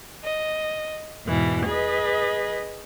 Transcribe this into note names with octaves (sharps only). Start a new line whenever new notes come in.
D#5
E2 G#2 B2 E3
G#4 B4 D#5